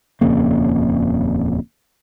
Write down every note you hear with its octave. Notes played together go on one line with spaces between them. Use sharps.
D#1 F2 C#3 A#3